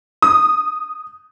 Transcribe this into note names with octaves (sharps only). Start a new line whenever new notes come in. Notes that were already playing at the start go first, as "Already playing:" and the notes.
D#6